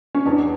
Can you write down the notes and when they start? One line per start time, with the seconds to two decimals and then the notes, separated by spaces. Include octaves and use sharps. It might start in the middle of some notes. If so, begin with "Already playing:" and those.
0.15 C#4
0.26 E2 D4